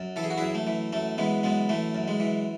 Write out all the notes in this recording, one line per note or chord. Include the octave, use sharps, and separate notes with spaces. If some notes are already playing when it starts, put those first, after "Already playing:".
Already playing: F#2
E3 A4
G#4
F#4
F#2 E4 G#4
A3
E3
F#2 A3
E3 G#3 B3
F#2 G#3 B3
E3 A3
F#2
G#3
E3